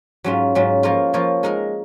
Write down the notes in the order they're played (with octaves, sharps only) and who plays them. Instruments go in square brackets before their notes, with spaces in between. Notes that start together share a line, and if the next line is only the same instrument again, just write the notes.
[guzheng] G#2 F#3 C#4 F4
G#2 F#3 C#4 F4
F3 A#3 F4 A#4 C#5
F3 A#3 F4 A#4 C#5
G#3 D#4 A#4 D#5